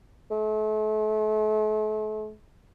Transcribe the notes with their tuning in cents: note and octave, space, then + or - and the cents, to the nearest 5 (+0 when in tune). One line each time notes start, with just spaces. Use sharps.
A3 -40